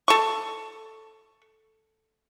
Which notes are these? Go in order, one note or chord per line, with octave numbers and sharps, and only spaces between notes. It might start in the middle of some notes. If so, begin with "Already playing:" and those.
A4 C#6